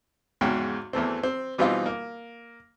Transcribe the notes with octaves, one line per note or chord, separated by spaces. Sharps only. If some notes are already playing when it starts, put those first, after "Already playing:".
E2 G#2 C#3 F#4 G5
E2 E3 A3 C4
C4
B2 E3 G3 C4 D#4 F4
A#3